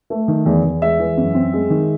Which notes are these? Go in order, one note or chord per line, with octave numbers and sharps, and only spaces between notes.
A3
D#3
E2
E2
G#3 E5
E3
F#2
C4
G#3
D#3